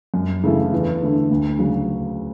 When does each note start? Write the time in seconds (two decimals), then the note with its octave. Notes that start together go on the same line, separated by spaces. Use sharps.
0.14 F#2
0.44 C#3 E3 A3 E4
0.73 E2
1.02 D3 A3 E4
1.31 D2
1.59 C#3 F#3